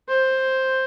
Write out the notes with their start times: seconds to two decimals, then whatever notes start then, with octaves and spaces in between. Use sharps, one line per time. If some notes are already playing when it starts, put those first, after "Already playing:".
0.08 C5